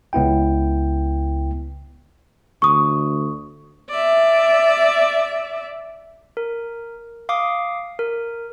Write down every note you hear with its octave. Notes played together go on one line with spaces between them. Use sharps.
C#2 B3 E4 G5
D2 C#6 D#6
D5 E5
A#4
F5 D6 D#6
A#4